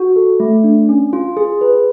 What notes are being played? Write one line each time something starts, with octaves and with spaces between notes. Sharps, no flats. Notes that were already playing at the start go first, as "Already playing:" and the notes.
Already playing: F#4
A4
A3
D4
C#4
F4
G#4
B4